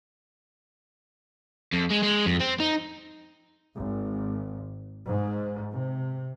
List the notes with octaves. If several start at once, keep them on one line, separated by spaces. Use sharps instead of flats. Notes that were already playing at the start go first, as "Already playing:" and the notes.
F2
G#3
G#3
F2
C4
D#4
G#1
G#2
C3